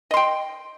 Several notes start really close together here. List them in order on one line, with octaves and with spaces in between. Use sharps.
D#5 C6 G5